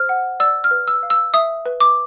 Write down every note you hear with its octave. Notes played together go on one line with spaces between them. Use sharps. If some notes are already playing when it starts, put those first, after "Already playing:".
Already playing: C5 F6
F#5
D5 E6
F6
B4
E6
F5
E6
E5 D#6
B4
D6